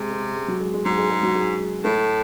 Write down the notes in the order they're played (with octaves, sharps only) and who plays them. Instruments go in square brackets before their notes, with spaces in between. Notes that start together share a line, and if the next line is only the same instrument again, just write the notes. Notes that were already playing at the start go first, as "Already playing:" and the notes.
Already playing: [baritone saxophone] C3 [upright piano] G#3
[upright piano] G#3
G#3
F#3
G#3
G#3
[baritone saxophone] G#2 [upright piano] F#3
[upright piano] G#3
G#3
F#3
G#3
[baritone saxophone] A2 [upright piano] A3